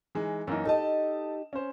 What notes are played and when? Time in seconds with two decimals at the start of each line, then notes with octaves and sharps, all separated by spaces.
0.15 E3 G#3 D#4
0.47 F#2 E3 A#3 D#4
0.65 D#4 G4 A4 D#5 A5
1.53 C#4 C5